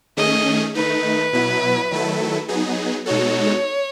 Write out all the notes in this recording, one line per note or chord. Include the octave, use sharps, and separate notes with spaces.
D#3 A3 C#4 G#4 D#5
D#3 A3 D#4 B4
B2 F#3 B3 E4
D#3 F#3 A3 E4 A4
F#3 B3 D#4 G#4
B2 G#3 D#4 F#4 A4 C#5